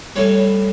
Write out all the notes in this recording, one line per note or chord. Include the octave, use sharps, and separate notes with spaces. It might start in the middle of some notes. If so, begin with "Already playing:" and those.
A2 E3 G3 C#5